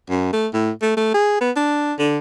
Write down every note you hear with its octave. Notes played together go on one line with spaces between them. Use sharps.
F#2
A3
A2
A3
A3
G#4
B3
D4
D3